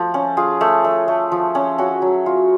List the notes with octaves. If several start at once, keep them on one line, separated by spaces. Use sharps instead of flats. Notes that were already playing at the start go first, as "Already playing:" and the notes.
Already playing: F3 A3
C#4
F4 G#4
A3
A3
A3
F3
C#4
C#4 F#4
F#3
F4